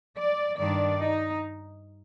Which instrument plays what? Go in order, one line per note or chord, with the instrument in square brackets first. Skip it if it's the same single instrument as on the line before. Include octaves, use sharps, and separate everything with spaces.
[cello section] D5
G2 D#3 G3 D4 D5
D#4